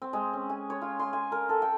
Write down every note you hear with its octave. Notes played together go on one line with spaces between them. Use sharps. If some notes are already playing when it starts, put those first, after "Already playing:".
C4
G#3
C#4
G#5
C#5
F4
C6
G#5
A#4
A4
G5